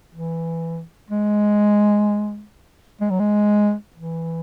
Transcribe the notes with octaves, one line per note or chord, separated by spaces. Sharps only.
E3
G#3
G#3
F#3
G#3
E3